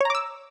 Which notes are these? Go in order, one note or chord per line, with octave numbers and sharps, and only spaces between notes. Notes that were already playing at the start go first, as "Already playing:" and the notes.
C#5 A#5 D6 E6